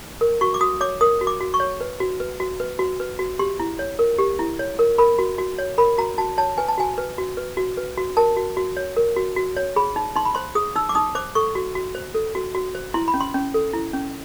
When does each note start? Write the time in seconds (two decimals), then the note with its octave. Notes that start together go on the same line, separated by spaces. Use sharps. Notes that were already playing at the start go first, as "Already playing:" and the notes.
0.21 A#4
0.41 F#4 C#6
0.54 D6
0.61 F#4 D#6
0.81 C#5 D6
1.01 A#4 D#6
1.21 F#4
1.27 D6
1.41 F#4
1.54 C#6
1.60 C#5
1.81 B4
2.00 F#4
2.20 B4
2.40 F#4
2.60 B4
2.79 F#4
3.00 B4
3.19 F#4
3.39 G4 C6
3.60 E4
3.79 C#5
3.99 A#4
4.18 G4
4.39 E4
4.59 C#5
4.79 A#4
4.98 A#4 B5
5.19 F#4
5.38 F#4
5.58 C#5
5.78 A#4 B5
5.98 F#4 A#5
6.18 F#4 A5
6.38 C#5 A5
6.58 B4 G#5
6.68 A5
6.78 F#4 G#5
6.98 B4
7.18 F#4
7.37 B4
7.57 F#4
7.77 B4
7.98 F#4
8.17 A#4 A5
8.37 F#4
8.57 F#4
8.77 C#5
8.97 A#4
9.16 F#4
9.36 F#4
9.57 C#5
9.76 G#4 B5
9.96 D#4
10.16 D#4 C6
10.25 B5
10.35 C5 C6
10.55 G#4 D#6
10.75 D#4 E6
10.89 D6
10.95 D#4 D#6
11.15 C5 D6
11.35 A4 C#6
11.55 F#4
11.75 F#4
11.95 C5
12.14 A4
12.35 F#4
12.55 F#4
12.75 C5
12.94 E4 C6
13.08 B5
13.14 C#4
13.21 C6
13.34 C#4
13.54 A4
13.73 E4
13.94 C#4